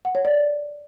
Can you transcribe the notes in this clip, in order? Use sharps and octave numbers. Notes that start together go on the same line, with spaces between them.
F#5
C#5
D5